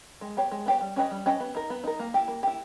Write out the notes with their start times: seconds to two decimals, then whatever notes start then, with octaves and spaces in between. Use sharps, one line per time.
0.21 G#3
0.37 B3 G4 C#5
0.51 G#3
0.66 B3 G4 C#5
0.81 G3
0.96 C#4 G4 B4 D#5
1.11 G3
1.26 C#4 G4 B4 D#5
1.40 B3
1.55 D#4 A#4
1.70 B3
1.84 D#4 A#4
1.99 A#3
2.14 E4 G4
2.28 A#3
2.43 E4 G4